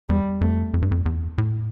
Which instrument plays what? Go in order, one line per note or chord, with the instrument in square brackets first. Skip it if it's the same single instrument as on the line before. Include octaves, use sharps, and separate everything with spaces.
[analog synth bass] E2 [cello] G3
[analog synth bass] F2 [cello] A3
[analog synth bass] F2
G2
F2
E2
A2